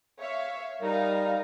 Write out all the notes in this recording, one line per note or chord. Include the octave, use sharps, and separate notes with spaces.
C#5 E5 F5
G3 D#4 A#4 F5 A#5